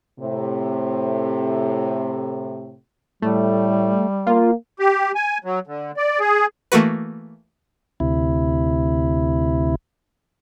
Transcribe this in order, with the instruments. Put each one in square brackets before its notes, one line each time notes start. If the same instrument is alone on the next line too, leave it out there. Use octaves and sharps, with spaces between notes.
[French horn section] A2 C3
[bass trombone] A2 [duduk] G3 [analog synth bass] A3
[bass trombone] A#3 [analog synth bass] F4
[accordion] G4
G#5
F#3
D3
D5
G#4
[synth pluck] E3 A3 A#3 F#4 B4
[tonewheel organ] D2 C3 E4